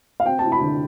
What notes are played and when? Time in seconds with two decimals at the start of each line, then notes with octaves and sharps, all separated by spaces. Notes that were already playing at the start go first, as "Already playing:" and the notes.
0.20 F5
0.26 C4 G5
0.39 E4 A5
0.52 B5
0.61 D3